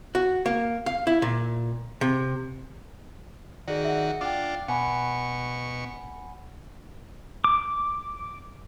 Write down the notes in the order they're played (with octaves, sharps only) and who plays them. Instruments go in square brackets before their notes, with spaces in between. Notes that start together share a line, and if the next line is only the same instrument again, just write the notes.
[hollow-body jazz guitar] F#4
A#3
F5
E4
A#2
C3
[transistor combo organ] D#3 F#4 [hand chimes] G#4 D5
[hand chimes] E5 F#5
[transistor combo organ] D4 F4 [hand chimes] G5 D6
[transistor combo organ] B2 C#6 [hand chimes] F#5 G#5 B5
[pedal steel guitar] D6